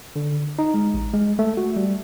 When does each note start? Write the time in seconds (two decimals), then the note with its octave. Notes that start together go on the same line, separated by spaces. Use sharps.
0.16 D3
0.59 D#4
0.74 G#3
0.94 A1
1.14 G#3
1.39 A3
1.57 F#4
1.76 G3